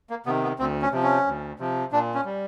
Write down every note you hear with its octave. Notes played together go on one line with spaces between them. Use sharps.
A#3
C3 D#3 B3
B3
D2 C4
C#4
C3 F3
C#4
D2
C3 F3
A#2 D4
C#4
G3